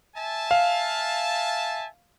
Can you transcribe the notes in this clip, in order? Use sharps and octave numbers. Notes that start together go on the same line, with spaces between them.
E5 G#5 A5
F5